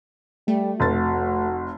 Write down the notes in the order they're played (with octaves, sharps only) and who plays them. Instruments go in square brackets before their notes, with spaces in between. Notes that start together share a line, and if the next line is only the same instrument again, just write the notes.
[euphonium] G3 [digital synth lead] A3
[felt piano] F1 A6 [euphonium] F#4